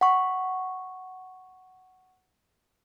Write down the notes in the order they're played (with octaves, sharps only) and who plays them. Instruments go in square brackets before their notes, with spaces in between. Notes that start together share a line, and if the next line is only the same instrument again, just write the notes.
[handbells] F#5 C#6